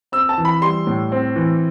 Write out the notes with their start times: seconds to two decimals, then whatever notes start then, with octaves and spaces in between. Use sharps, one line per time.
0.12 C4 E6
0.29 A5
0.38 E3
0.45 B5
0.61 G3 C6
0.87 A2
1.12 C4
1.36 E3